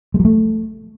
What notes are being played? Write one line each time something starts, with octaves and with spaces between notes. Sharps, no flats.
G#3
F#3
A3